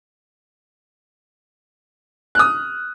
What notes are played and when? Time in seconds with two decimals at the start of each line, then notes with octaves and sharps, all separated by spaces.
2.35 D#6 F6 F#6